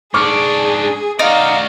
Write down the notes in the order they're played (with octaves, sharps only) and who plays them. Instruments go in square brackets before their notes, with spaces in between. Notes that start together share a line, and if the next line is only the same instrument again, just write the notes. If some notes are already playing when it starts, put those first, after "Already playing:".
[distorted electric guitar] G#2 D4 [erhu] G#4 [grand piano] C#6 D6 F6
[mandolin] D#4 [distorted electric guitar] F#4 D5 [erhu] F5